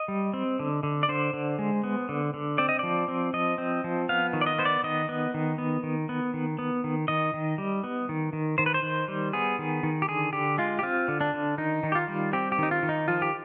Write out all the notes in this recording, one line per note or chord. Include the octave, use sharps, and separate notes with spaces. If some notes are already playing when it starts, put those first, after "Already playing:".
Already playing: D#5
G3
C4
D3
D3
D5
D3 C5
D3
G#3
B3
D3
D3
C4 D5
D#5
F3 D5
C4
F3 D#5
C4
F3
B3 F5
D#3
D5
D#5
B3 C5
D5
D#3 D#5
B3
D#3
B3
D#3
B3
D#3
B3
D#3
D#3 D#5
D#3
G3
B3
D#3
D#3
D#3 C5
B4
C5
D#3
G3
B3 G#4
D#3
D#3
G4
D3 G#4
D3 G4
G#3 F4
G4
C4 F4
D3
D4
D3
D#3 D#4
D#3
G4
F4
G3
C4 G4
G4
D#3 D#4
F4
D#3
D#4
F3 F4
G4